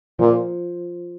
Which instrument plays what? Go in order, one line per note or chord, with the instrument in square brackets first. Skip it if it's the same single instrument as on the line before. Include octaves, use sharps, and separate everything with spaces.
[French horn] A#2 [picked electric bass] F3